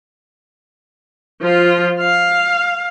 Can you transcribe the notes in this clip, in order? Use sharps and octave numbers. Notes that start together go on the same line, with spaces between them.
F3 F4
F5